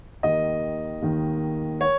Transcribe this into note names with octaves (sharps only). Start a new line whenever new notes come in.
D#2 D#3 D#5
D#2 D#3
C#5